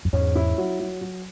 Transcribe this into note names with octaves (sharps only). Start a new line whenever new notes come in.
F#2
E2 G#2 C#4
E4
F#3
F#3
F#3